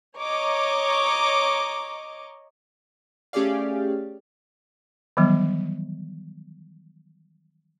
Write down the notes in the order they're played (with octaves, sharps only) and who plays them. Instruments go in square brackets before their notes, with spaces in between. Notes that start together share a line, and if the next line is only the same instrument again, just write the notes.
[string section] C#5 D#5 A#5 D6
[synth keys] A3 C#4 G4 G#4 D5 F5
[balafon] D#3 E3 F#3 G3 B3